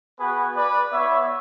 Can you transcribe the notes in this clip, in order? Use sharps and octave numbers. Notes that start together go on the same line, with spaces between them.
B3 F#4 G#4 B4
B4 D5
B3 E4 C#5 E5